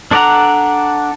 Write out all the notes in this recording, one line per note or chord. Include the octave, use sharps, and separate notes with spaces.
D4 A4 D5 F#5 A#5